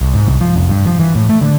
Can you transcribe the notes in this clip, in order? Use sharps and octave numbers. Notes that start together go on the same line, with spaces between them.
C2
G#2
C2
F3
F1
G2
F3
E3
A2
A3
D3